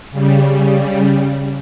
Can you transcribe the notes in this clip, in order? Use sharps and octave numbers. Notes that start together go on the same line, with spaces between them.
C#3 G3